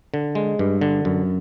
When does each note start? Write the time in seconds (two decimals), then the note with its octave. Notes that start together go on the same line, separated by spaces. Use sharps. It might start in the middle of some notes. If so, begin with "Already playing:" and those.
0.14 D3
0.35 G#3
0.59 G2
0.81 D3
1.05 F#2